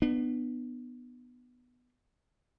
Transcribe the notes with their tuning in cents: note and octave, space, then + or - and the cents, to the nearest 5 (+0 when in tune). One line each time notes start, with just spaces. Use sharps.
B3 +0 D4 +40